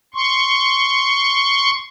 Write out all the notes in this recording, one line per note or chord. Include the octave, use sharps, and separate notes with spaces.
C6 C#6